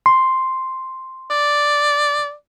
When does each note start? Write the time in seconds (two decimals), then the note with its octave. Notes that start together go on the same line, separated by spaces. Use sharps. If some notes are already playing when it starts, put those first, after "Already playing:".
0.06 C6
1.30 D5